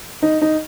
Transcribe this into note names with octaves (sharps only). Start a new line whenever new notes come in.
D#4
D#4